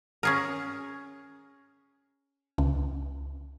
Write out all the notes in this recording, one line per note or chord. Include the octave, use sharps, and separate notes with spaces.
C#4 G#4 A#4
C#2